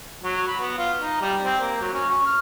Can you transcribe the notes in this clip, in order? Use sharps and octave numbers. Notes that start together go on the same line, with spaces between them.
F#3
B5
B3
F4
D#4
G3
C4
A#3
F#3
C#4
C#6
F6